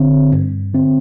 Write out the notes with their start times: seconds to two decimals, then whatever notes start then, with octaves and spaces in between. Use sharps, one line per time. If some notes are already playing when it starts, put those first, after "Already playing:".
Already playing: D3 C4
0.32 G2
0.73 D3 C4